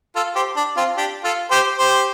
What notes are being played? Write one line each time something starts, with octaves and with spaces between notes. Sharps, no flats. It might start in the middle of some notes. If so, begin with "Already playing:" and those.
F4 A4
G4 C5
D4
C4 F4
D4 G4
F4 A4
G4 C5
G4 C5